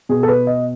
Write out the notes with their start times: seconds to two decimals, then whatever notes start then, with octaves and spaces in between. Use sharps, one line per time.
0.09 B2 G#4
0.23 A4
0.28 B4
0.47 D#5